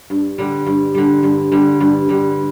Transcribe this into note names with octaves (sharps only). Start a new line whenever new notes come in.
G2
D3 G3
G2
D3 G3
G2
D3 G3
G2
D3 G3